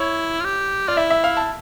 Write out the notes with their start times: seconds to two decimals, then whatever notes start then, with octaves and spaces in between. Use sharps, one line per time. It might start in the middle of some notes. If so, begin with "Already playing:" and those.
Already playing: E4 C#5
0.40 F4
0.45 G4
0.88 F4 D5
0.97 E4 E5
1.10 E5
1.24 F5
1.37 A5